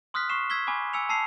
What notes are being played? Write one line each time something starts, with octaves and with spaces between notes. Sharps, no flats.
C6 D#6 F6 F#6 B6
C#6 C7 E7
E6 G#6 B6 G7
G#5 B5 D6
G#5 E6 C#7 F7
A5 E6 C7 F7